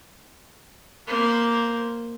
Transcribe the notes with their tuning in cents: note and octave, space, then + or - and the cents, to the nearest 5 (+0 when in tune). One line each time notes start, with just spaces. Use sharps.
A#3 +0 C5 +0